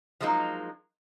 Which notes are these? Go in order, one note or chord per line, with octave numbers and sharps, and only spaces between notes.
F3 F#3 G#3 A#3 D#4